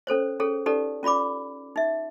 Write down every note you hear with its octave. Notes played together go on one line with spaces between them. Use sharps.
C#4 A4 C5 C#5
C#4 G#4 A4 C#5
C#4 D#4 G4 A4 B4 D5
C#4 F4 D5 B5 D6
D#4 E5